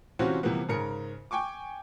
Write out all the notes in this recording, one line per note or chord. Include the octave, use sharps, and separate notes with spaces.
C3 E3 C4 C#4 F4 F#4
C3 E3 F3 G3 A#3 B3
G#2 C#3 A#4 C#7
G5 G#5 C#6 D6